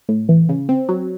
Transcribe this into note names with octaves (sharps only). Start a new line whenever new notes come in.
A2
E3
C#3
C4
F#3